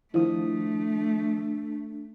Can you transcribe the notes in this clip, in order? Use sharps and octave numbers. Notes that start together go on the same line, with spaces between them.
D#3 F3 A3 D4 E4 D#6